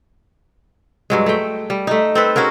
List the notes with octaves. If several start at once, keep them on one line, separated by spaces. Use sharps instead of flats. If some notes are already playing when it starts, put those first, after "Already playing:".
G2 F#3 G#3
A3 G5
G3
A3 D#4
C4 A4 B4
C#4 F#4 G#4 A#4